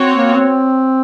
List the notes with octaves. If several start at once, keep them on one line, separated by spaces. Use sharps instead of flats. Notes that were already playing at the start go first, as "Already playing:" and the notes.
Already playing: C4 F#4 C#5
A#3
C4